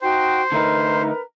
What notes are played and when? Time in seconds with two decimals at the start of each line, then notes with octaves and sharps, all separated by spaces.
0.01 D#4 F#4 C5 G5
0.52 D3 A3 D#4 A#4 B4 A#5